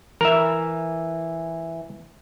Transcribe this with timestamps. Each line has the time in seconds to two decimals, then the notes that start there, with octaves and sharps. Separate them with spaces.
0.21 E3 A#4 E5